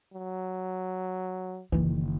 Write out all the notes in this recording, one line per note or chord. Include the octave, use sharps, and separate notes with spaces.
F#3
F#1 D#3 E3